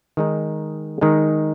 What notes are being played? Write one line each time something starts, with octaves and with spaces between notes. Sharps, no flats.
D#3 G#3 D#4
D#3 G#3 D#4